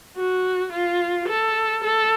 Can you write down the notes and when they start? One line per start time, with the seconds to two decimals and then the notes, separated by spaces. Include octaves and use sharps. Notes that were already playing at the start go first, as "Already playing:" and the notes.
0.17 F#4
0.72 F4
1.28 A4
1.84 A4